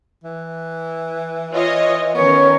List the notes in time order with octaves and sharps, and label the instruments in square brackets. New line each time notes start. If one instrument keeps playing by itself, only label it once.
[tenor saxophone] E3
[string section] F4 C#5 D#5
[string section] D#3 C#4 A#4 [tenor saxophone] B3 [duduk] C#5